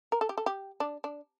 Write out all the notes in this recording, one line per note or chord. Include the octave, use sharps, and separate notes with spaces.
A#4
A4
G4
A4
G4
D4
D4